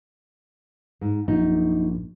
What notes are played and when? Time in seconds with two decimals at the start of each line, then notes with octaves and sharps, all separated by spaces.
1.01 G#2
1.28 A#1 F#2 D#4